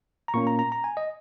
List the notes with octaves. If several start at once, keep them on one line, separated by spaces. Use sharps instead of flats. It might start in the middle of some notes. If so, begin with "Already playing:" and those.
A#5
A#2 A#3 C#4 C#6
A#5
A#5
A#5
G#5
D#5